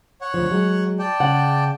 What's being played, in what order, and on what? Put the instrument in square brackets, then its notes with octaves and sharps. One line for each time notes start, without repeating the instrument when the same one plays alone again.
[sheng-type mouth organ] C#5 F#5
[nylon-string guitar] D2 F3
F#3 G#3
[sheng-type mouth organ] D5 G5 A5
[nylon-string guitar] C#3 F#5